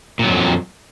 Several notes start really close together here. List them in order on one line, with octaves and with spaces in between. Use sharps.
A#2 F#3 F2